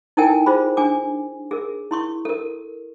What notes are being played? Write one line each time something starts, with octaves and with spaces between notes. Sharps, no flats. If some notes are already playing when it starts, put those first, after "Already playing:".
D#4 E4 A4 A#4 G5 G#5
F4 G#4 C5 B5
D4 G#5 D6
G#4 A#4
E4 C6 C#6
A4 A#4